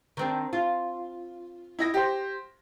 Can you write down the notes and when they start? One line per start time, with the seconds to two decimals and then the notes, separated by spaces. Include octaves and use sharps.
0.17 D#3 C4 D4
0.53 F4
1.79 E4 D#5 A#6
1.94 G4 C5